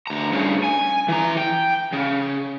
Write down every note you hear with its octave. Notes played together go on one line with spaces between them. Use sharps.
D2 A#5
G2 C#3
G#5
E3 A#5
G5
C#3